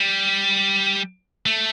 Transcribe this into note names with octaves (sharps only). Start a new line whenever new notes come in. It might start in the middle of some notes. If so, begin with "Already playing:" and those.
Already playing: G3
A3